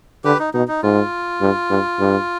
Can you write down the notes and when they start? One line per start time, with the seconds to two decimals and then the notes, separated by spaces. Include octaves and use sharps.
0.24 D3 G4 B4
0.39 D#4
0.54 B2 D#4
0.68 D#4
0.83 G#2 F4
1.41 G2
1.70 G2
1.99 G2